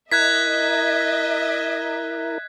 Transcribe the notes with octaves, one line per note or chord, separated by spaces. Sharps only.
E4 A#4 D#5 E5 F#6 G#6 B6